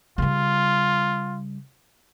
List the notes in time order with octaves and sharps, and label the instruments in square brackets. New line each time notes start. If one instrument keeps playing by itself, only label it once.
[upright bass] C#3 G3 [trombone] F4